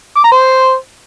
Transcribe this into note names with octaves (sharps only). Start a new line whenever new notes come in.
D6
A#5
C5